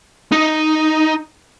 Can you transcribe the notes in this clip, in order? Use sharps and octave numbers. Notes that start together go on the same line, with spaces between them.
D#4